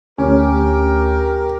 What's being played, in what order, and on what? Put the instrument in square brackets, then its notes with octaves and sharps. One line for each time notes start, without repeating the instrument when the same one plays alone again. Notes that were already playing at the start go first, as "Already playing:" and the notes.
[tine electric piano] D2 [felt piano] C#4 [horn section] G4 A#4